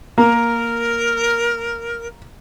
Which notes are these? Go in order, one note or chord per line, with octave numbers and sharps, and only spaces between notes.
A#3 A#4